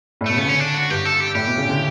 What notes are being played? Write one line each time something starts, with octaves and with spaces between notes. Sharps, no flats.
A2
B2 A3
C#3 B3
D3 C#4
D4
F#4
G2 G4
A4
G4
A2 G4
B2
C#3
D3